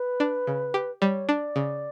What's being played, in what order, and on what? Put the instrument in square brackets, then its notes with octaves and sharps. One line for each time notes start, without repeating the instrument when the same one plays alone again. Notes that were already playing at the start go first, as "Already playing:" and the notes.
Already playing: [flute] B4
[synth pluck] D4
C#3
G4
[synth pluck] G3 [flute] C#5
[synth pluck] D4 [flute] D5
[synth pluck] C#3